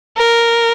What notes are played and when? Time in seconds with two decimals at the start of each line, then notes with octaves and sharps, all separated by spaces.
0.17 A#4